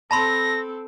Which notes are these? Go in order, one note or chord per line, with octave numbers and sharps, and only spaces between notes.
C4 A4 A5 B5 C6 A#6